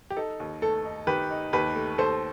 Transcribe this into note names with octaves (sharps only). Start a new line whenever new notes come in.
G4
D#4 A4
D#2
A3 A4
D#4
D#3 G4 B4
D#4
D#2 G4 B4
A3
D#2 A4 C5